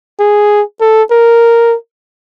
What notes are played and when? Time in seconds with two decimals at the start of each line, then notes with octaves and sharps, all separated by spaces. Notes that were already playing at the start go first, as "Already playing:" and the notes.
0.20 G#4
0.81 A4
1.11 A#4